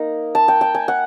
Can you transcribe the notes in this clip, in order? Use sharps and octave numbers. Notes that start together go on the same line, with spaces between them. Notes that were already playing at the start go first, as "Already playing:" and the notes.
Already playing: A#3 D#4
A5
G5
G5
G#5
F#5